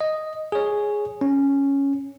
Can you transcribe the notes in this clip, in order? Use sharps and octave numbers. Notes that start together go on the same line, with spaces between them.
D#5
G#4 C#5
C#4